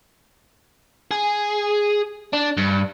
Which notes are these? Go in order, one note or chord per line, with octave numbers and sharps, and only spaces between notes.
G#4
D4
G2